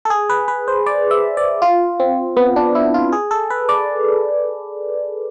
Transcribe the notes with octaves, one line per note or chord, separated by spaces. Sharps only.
A4
G#4
B4
B4
C5
D5
E5
D5
F4
C4
B3
D4
E4
F4
G#4
A4
B4
D5